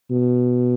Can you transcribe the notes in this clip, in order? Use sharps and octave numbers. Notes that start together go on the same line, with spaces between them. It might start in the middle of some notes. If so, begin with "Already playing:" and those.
B2